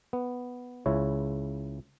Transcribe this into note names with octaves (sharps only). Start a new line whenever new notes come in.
B3
C#2 C#3 E4 C#5